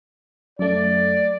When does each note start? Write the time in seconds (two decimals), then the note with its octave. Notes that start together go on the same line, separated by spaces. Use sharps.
0.59 F#2 A3 D5